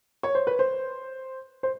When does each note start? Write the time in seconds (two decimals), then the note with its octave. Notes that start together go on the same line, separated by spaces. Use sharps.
0.23 C#5
0.35 C5
0.47 B4
0.59 C5
1.63 C5